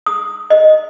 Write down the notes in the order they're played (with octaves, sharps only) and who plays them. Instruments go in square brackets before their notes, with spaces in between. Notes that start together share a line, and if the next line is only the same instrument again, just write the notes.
[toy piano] D#6
D#5